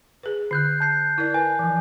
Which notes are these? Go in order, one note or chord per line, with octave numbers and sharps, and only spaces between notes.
G#4 B4
D3 F#6 G6 C7
A5 G6 C7
E4 A#4 D5
B4 G#5
E3 F3